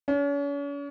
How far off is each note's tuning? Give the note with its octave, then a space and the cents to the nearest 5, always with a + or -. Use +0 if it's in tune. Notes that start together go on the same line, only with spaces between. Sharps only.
C#4 +40